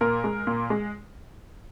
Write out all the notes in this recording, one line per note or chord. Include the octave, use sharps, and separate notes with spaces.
A#2 A#4
G#3
A#2
G#3